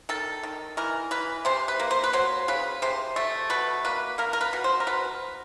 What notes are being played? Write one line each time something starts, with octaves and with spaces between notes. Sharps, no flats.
D#3 A4
D#3
E3 A#4
E3 B4
C3 C5
B4
A#3
C5
B4
F#3 C5
C#3 B4
C3 C5
A3
B2 B4
A#3 B4
A#3 A#4
A#4
B4
B2
C5
A#4
B2 B4